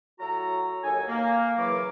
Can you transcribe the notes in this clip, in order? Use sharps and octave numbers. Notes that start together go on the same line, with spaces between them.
A2 F#3 F#4 A4 A#5
D#2 F#3 D#4 A4 G#5
A#3
C#3 E3 F#3 A#4 C#5 D6